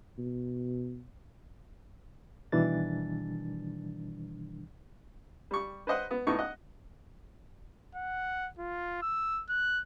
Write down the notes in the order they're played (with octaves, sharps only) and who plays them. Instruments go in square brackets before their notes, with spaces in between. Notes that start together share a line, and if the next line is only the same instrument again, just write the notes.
[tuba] B2
[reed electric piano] B2 D#3 E3 G3 D4 A6
[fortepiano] G3 C#6
B4 C5 D#5 F#5
B3
A2 B3 D#4 C#6
D#5 F#5
[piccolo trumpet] F#5
F4
E6
F#6